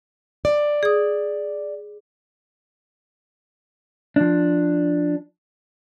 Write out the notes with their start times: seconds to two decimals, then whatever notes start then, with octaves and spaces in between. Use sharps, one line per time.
0.45 D5
0.83 G#4 D#6
4.16 F3 D4